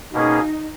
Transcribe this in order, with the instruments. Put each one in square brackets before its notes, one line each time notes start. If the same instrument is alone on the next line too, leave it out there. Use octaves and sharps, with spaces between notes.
[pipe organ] B2 A#3 C#4 G#4 [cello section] D#4